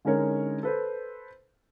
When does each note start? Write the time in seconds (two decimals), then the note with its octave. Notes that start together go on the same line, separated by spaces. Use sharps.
0.05 D3 G#3 C#4 D#4 A#4 C#5
0.63 A4 B4 C5